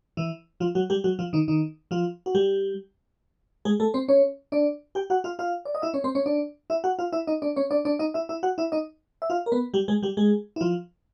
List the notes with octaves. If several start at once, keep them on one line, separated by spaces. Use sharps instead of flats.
E3 E4
F3 F4
F#3 F#4
G3 G4
F#3 F#4
F3 F4
D#3 D#4
D#3 D#4
F3 F4
F#4
G3 G4
G#3 G#4
A3 A4
C4 C5
C#4 C#5
D4 D5
G4 G5
F#4 F#5
F4 F5
F4 F5
D5
D#5
E4 E5
C#4 C#5
C4 C5
C#4 C#5
D4 D5
E4 E5
F#4 F#5
F4 F5
E4 E5
D#4 D#5
D4 D5
C#4 C#5
D4 D5
D4 D5
D#4 D#5
E4 E5
E4 E5
F#4 F#5
E4 E5
D#4 D#5
E5
F4 F5
A#4
B3 B4
G3 G4
G#3 G#4
G3 G4
G#3 G#4
E4
F3 F4